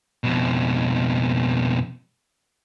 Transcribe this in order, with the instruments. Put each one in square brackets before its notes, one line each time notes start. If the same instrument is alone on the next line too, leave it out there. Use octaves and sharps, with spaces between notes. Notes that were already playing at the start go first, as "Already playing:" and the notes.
[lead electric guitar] F2 B2